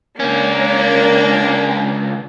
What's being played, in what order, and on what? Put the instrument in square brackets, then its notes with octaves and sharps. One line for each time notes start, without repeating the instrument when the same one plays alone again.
[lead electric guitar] C#2 C#4 [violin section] A#3 D4